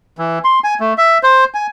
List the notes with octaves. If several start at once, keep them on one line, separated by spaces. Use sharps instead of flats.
E3
C6
G#5
A3
E5
C5
G#5